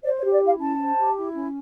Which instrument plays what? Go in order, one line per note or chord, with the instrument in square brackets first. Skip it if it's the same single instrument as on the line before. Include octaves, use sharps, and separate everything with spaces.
[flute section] C5 D5
C#5
G4
D5
E4 F5
C#4 A5
C5
G4
E4
C#4